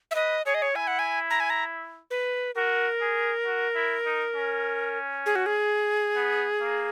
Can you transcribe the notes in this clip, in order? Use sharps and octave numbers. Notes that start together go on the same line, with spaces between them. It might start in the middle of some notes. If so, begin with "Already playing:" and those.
E5
B4 D#5
G#4 C#5
D#5
C#5
E4 G#5
F#5
G#5
A#5
G#5
A#5
B4
F#4 A#4
G#4
F#4
E4
D#4
C#4
G#4
F#4
G#4
B3
A#3